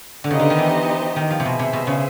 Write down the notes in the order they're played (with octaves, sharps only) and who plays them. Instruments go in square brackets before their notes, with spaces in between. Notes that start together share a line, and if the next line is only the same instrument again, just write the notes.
[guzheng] D3
[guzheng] C#3 [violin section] B3 D#4 G4 C5 D#5
[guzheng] D3
D#3
E3
D#3
F3
C3
[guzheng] B2 [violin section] G#4 C5 E5
[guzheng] C3
B2
C#3